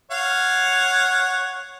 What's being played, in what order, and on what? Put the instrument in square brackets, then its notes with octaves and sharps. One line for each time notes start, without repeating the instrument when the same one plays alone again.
[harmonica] C#5 F5 F#5